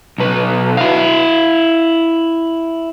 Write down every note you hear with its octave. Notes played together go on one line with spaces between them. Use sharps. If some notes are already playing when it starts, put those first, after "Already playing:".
B1 B4
E4 F5